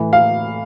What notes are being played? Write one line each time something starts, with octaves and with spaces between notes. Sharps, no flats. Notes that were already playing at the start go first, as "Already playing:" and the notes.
Already playing: A2 E3
F5